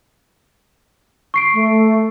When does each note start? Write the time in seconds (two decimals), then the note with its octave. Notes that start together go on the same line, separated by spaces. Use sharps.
1.34 C#6 C7 D7
1.54 A3